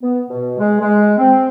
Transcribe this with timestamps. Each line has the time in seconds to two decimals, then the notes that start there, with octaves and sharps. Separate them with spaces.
0.02 B3
0.30 B2
0.58 G#3
0.81 G#3
1.17 C4